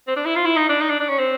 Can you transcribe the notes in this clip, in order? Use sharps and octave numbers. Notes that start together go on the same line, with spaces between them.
C4
D4
E4
F4
E4
D#4
D4
D#4
D4
D4
C#4
C4